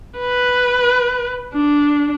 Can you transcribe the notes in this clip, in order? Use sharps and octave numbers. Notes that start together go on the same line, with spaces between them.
B4
D4